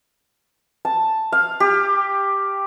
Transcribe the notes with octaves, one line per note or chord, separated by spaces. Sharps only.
A5
F5
G4